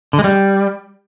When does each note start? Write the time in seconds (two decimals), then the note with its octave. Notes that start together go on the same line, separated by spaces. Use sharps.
0.13 D3
0.19 G#3
0.24 G3